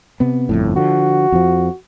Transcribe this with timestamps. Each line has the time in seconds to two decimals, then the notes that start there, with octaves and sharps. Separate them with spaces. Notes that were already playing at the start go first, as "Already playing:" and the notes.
0.20 C3 B3
0.49 G1 F2 A2
0.76 D3 F3 F#4
1.32 F2 F3